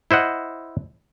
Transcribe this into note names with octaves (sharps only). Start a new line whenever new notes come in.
E4 C5 D#5 F#5